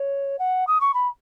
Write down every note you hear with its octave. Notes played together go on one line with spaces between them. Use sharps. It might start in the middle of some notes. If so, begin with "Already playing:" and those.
Already playing: C#5
F#5
D#6
C#6
B5